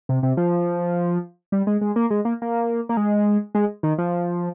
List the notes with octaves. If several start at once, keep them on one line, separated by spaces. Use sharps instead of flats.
C3
C3
F3
G3
G#3
G#3
A#3
G#3
A#3
A#3
A#3
G#3
G#3
D#3
F3